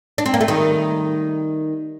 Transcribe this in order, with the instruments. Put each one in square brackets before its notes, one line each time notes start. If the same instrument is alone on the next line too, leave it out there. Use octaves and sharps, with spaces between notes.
[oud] D4
C4
A#3
A3
D#3 G3